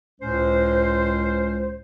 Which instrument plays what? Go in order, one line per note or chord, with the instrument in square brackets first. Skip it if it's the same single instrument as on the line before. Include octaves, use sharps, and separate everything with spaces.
[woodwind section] C#2 A2 G#3 C#4 C5